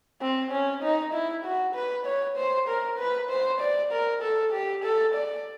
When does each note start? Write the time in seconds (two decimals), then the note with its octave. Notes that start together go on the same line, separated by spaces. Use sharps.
0.21 C4
0.52 C#4
0.83 D#4
1.13 E4
1.45 F#4
1.75 B4
2.06 C#5
2.37 C5
2.68 A#4
2.99 B4
3.30 C5
3.61 D5
3.92 A#4
4.22 A4
4.53 G4
4.84 A4
5.15 D5